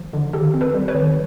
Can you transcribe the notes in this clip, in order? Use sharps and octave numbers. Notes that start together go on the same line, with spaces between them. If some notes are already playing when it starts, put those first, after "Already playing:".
Already playing: F3
D3
D#3 G4 A4
C4
A4 B4
G3
B4 C#5
D#3